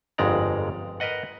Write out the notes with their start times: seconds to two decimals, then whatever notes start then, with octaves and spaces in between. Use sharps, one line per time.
0.18 G1 F2 G#2 G#3 D5 A#5
1.00 A#4 B4 D#5 F#5